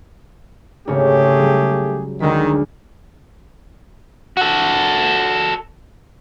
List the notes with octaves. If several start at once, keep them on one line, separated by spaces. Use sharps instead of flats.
G#1 C#3 A3 G4 G#4 C#5
F#3 G3
D2 D#3 G#3 B6
F#4 A4